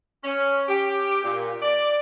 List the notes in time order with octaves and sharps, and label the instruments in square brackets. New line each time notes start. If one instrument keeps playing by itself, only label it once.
[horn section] C#4
G4
A#2
D5